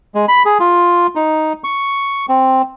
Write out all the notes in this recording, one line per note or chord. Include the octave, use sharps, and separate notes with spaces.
G#3
B5
G#4
F4
D#4
C#6
C4